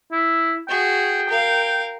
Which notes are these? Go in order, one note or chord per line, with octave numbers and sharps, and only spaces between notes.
E4
F#4 G#4 G5
A#4 F5